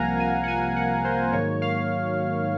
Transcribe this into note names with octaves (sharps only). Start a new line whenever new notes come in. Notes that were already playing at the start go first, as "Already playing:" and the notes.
Already playing: C2 C3 F3 A#3 F5 F#5 G#5 A#5
G#5
F#5
G#5
F#5
C5
G#2 D#3 F#3 A#3 C#5
F5